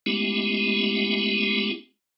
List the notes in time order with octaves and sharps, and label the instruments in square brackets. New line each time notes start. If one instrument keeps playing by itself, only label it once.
[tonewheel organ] G#3 A3 B3 C#4 E4 G4